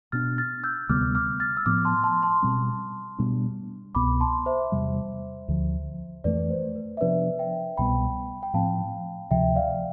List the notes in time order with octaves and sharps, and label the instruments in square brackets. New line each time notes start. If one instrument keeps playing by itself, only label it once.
[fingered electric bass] B2 B3 D4 [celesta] F6 A6
[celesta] F6 A6
E6 G6
[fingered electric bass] D2 C3 G3 B3 [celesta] D6 F6
[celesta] D6 F6
F6 A6
E6
[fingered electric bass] A2 F3 B3 [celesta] D6 F6
[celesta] A5 C6
A5 C6
A5 C6
[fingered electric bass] B2 G3 C4
B2 G3 B3 D4
[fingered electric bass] C2 B2 B3 [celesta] B5 D6
[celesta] A5 C6
C5 E5
[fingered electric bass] E2 C3 G3
D2 D3 F3
[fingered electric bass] F2 E3 A3 [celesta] B4 D5
[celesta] C5
B4
E5
[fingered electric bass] C3 F3 B3 D4 [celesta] B4 D5
[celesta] E5 G5
[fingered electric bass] C2 B2 G3 B3 [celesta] G5 B5
[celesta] G5
[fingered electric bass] A2 F3 C4 [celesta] F5 A5
[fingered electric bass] D2 C3 F3 [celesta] E5 G5
[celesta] D5 F5